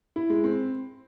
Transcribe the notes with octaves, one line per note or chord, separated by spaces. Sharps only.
E4
G#3
C4